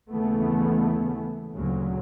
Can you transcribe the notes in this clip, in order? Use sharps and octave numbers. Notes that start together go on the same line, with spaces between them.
D#2 C#3 E3 A3 B3
D2 A#2 C#3 F#3